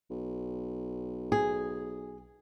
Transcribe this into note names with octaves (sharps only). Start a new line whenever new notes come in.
B1
G#4